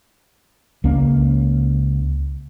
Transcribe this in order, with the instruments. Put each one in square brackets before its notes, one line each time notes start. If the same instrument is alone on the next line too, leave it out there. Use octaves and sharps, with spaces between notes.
[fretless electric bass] C#2 A#3 C#4